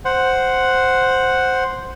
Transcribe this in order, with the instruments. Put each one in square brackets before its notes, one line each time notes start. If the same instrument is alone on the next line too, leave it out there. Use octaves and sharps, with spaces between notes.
[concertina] C5 F#5